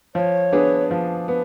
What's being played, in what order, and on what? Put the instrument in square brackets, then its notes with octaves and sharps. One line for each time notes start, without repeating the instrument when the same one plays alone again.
[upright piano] F3 [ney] C#5
[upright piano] B3 D4 G#4
F3
B3